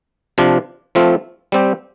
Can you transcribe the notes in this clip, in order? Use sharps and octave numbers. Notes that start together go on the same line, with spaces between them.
C3 F3 D4 F4
F3 A3 C4 F4
G3 C4 G4